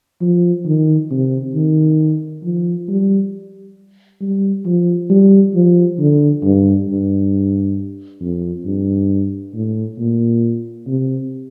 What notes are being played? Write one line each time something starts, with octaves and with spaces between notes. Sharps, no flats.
F3
D#3
C3
D#3
F3
G3
G3
F3
G3
F3
D3
G2
G2
F2
G2
A2
A#2
C3